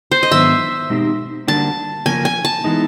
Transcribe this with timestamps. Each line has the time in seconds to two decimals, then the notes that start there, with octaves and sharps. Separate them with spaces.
0.11 C5
0.23 D#5
0.31 G#2 D#3 F#3 B3 D4 E5
0.90 B2 G#3 C4 D#4 G4
1.47 D3 G3 A#3 D4 F#4 A5
2.06 C#3 F3 A#3 C#4 G#5
2.25 G#5
2.45 A5
2.64 E3 G#3 B3 D#4